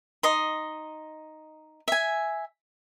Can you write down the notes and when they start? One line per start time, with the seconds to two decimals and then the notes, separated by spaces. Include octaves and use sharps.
0.23 D#4 D#5 C6
1.88 E5 G#5